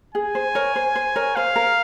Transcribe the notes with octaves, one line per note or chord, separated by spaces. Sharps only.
G#4 G#5
C5
A#4 C#5
C5
C5
A#4 C#5
C5 F5
A#4